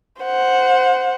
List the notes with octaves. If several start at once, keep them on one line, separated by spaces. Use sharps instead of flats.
C5 F#5